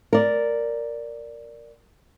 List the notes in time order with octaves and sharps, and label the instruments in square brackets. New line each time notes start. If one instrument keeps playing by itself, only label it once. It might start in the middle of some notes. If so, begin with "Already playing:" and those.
[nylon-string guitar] A#4 D5